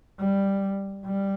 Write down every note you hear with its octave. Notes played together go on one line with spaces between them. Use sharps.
G3
G3